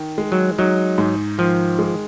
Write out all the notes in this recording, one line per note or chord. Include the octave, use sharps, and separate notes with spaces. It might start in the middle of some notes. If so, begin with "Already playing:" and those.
Already playing: D#3
G#3
F#3
F#3 D#4
G#2
D#3 F3
G#3